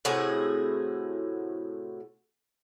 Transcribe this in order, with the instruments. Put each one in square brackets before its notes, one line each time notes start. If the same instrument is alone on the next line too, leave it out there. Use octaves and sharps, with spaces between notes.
[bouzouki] A2 C3 F#4 G#4